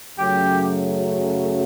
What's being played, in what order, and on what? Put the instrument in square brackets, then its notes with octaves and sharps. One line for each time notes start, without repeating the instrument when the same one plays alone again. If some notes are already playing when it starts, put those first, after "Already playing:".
[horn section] F#2 C#3 F#3 A3 G4